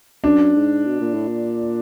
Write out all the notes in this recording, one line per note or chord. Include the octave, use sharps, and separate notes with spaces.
F#2 D4
G#2
B2
A#2
A2
A#2